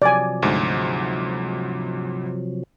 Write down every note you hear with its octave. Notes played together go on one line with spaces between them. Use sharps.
C3 F3 F#3 D5 G#5
D2 G#2